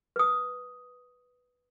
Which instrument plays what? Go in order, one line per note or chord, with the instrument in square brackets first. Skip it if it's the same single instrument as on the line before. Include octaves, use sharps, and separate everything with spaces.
[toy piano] B4 D#6